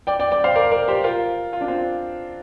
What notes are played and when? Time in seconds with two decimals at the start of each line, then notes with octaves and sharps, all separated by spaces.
0.07 D5 G5
0.19 D5 G5
0.31 D5 G5
0.44 C5 F5
0.56 A#4 D5
0.72 A#4 D5
0.88 G4 C5
1.04 F4 A#4
1.53 F4
1.61 D4
1.68 C4 F4